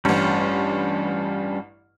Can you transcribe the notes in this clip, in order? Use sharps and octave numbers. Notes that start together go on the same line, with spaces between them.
A1 G2 G3 C#4 F4